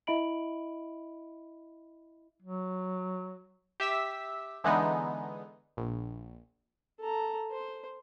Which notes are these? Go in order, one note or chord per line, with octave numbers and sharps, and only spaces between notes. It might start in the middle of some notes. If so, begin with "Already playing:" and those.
E4 D#5 E5 B5 D7 F#7
F#3
G4 E5 E6 B6
D3 E3 G#3 B3 D#4
A#1
A4 A#5
C5